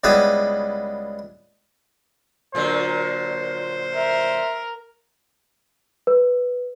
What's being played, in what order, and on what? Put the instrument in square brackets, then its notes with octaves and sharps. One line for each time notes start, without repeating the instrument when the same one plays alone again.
[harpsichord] C#2 G3 B3 E4 G#4 B4
[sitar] A#2 D3 F#3 [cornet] C5
[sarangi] A#4 [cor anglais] E5
[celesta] B4